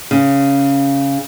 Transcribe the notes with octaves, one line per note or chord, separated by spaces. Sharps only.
C#3